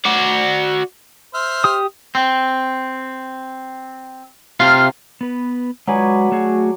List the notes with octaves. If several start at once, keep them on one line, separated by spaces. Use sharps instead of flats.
F#4 D5
C5 E5 F6
G4 D#6
C4
C3 F4 F5
B3 B4
F#3 G#3 B4 D5 G#5
A3 F#4 G#4